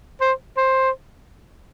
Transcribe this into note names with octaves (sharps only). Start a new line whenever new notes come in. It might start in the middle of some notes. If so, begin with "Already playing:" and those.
C5
C5